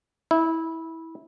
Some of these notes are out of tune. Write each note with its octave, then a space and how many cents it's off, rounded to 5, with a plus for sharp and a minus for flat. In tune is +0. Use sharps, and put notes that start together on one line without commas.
E4 -20